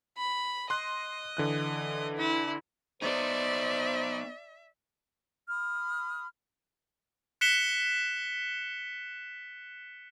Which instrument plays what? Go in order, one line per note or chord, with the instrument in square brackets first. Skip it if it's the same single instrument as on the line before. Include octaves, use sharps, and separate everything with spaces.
[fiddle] B5
[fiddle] D#5 [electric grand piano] C6 F#6
[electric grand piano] D3 E3 F#6
[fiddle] E4
[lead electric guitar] B3 D#4 [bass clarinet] C5 [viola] D5 [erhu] E5
[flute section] B5 D#6 F6
[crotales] F#6 B6 C#7 E7 G7